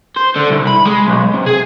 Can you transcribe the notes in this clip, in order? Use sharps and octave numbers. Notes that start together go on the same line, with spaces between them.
C5
D3
C2
B5
G#3
B1
C3
G#4